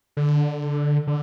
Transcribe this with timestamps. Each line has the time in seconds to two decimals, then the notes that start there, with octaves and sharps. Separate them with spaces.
0.17 D3
1.07 D3